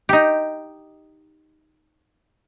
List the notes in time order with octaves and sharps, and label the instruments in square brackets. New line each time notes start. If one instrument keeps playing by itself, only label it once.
[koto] D#4 G4